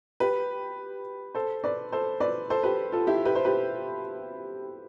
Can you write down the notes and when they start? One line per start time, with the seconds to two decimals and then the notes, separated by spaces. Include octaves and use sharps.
0.20 G4 B4
1.35 A4 C5
1.64 B4 D5
1.92 A4 C5
2.20 B4 D5
2.50 A4 C5
2.63 G4 B4
2.92 F4 A4
3.07 E4 G4
3.25 G4 B4
3.35 C5
3.45 G4 B4